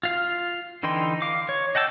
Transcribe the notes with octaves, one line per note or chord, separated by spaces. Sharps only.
F4 F5
D3 E3 D#4 G5 C6
F5 D6
C#5
D#5 F#5 G5 A5 E6